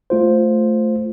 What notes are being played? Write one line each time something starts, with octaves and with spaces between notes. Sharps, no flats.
A3 F4 C5